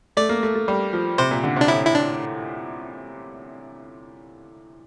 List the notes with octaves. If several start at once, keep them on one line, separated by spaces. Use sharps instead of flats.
A3 D5
A#3
A3
A3
G3
F3
C3 C5
A#2
D3
C3
D4
A2 E4
E4
D4